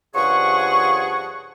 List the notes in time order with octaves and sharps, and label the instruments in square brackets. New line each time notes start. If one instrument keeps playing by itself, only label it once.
[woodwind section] G2 C#3 F3 G#4 F#5 C#6